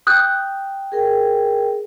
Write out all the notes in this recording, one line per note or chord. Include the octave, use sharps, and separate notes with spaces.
G5 D#6 F#6 G6
G#4 A#4 G5